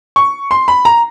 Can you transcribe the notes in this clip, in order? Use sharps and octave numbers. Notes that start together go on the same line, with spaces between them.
C#6
C6
B5
A#5